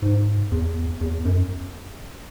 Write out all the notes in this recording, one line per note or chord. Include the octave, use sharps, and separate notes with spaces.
G#2
E2
E2
F#2